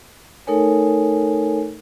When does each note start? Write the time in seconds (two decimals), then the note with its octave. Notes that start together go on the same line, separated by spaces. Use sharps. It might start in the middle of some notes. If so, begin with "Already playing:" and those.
0.47 A3 D#4 A4 A#4 C#5 G#5